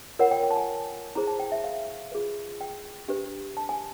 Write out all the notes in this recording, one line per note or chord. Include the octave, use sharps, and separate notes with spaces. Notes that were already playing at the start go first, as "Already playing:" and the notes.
F4 A#4 C#5 F#5
G5
G5
A5
G#5
E4 G#4 C5 A#5
A5
G5
E5
F5
F4 G#4 B4
G5
D4 G4 B4
A5
G#5